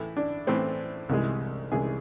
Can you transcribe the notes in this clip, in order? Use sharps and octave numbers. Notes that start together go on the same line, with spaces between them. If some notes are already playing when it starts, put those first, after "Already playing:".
Already playing: A2 E3 A3 E4
D4
A2 E3 A3 C4
C2 C3 E3 G#3
C2 C3 E3 G#3 G#4